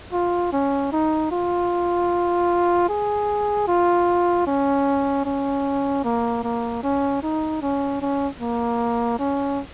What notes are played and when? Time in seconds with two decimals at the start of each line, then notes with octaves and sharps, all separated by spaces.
0.13 F4
0.52 C#4
0.92 D#4
1.31 F4
2.89 G#4
3.68 F4
4.47 C#4
5.25 C#4
6.04 A#3
6.43 A#3
6.83 C#4
7.23 D#4
7.62 C#4
8.01 C#4
8.40 A#3
9.19 C#4